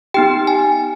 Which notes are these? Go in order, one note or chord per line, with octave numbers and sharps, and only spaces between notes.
B3 D#4 G4 G5
G#5